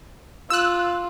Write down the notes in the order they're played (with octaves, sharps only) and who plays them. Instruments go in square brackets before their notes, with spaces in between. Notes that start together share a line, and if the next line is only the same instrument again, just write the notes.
[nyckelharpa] F4 [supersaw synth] E6 F#6